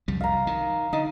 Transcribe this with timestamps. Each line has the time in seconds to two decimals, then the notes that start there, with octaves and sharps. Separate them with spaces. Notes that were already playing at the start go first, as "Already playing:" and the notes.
0.08 C2 F2 G3
0.21 F5 A#5
0.47 D#3
0.93 D3 D#4